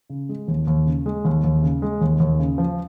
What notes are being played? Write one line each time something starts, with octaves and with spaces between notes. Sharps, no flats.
C#3
G#3
D#2
D#2
C#3
G#3
D#2
D#2
C#3
G#3
D#2
D#2
C#3
F3